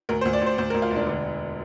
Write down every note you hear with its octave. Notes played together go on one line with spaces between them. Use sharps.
D2 A#4
C5
D2
D5
D2 C5
D2 C5
A#4
D2
F4
E1 D4
D3